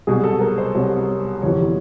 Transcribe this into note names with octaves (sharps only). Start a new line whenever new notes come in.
C2 B2 F#3 G#4
A4
A#4
C5
C2 B2 F#3 C#5
G1 F2 C3 E3 G3 C#5